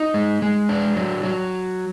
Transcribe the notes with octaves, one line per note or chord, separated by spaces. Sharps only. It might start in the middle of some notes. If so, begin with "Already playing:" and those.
Already playing: D#4
G#3
G#3
D4
F#3
F#3